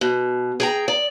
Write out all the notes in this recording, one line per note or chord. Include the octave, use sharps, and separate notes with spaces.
B2
G#4 G5 A#5
D5